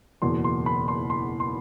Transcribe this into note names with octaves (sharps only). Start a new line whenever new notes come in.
F#1 E2 B2 C6
C6
B5
C6
C6
C6